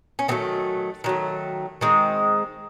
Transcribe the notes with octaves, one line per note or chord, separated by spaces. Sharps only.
C#4
D#3 F#3 A3 C4
D#3 F#3 A3
D#3 G#3 C4